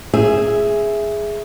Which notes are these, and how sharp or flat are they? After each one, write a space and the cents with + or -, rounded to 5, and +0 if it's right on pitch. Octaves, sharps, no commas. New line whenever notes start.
G#4 +0 E5 +0